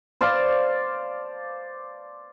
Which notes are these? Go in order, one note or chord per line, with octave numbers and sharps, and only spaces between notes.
C5 D5 F5 A5